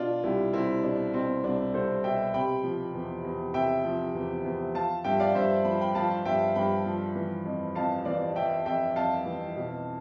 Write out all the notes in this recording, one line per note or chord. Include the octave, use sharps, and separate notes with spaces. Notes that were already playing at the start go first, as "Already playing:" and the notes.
Already playing: B2 D4 F4
C2 E4 G4
C2 C4 E4
B2 D4
B2 C4
C2 D4
C2 A4 C5
B2 E5 G5
C3 G5 B5
F3
E2
E2
C3 E5 G5
F3
E2
E2
F3 F5 A5
G2 E5 G5
D5 F5
G2 C5 E5
F3 B5
G5 B5
F3 F5 A5
G2 E5 G5
G2 G5 B5
F3
E3
F2
F2 F5 A5
E3 D5 F5
E3 E5 G5
F2 E5 G5
F2 F5 A5
E3
B2